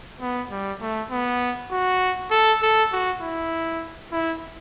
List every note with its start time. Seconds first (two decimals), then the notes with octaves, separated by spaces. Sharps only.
0.21 B3
0.51 G3
0.81 A3
1.11 B3
1.72 F#4
2.31 A4
2.62 A4
2.92 F#4
3.21 E4
4.12 E4